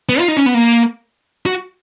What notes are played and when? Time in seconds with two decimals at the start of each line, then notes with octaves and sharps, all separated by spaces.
0.09 B3
0.19 F4
0.28 D#4
0.37 C#4
0.46 B3
0.54 A#3
1.46 F#4